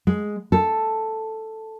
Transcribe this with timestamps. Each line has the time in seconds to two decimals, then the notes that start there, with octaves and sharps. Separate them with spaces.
0.07 G#3
0.52 A4